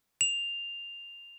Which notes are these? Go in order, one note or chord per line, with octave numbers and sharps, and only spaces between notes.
F7